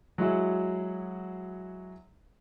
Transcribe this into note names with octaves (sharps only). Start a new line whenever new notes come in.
F#3 G#3 E4 F#4 G#4